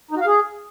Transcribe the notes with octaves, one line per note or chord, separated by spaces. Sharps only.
D#4
F#4
F5
G#4